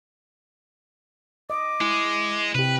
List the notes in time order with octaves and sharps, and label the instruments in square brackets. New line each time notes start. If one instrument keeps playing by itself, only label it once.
[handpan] D#5 [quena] D6
[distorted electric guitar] G#3 [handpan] E4
[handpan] C3 G4 [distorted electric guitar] B4